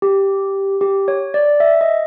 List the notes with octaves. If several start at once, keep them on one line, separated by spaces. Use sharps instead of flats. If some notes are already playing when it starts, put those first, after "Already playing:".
G4
G4
C#5
D5
E5
D#5